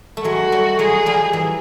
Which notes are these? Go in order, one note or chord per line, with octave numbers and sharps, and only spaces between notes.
A3
F#3 G#3 F#4
G3 A3
F#3 G#3 G#4
F3 G3
E3 F#3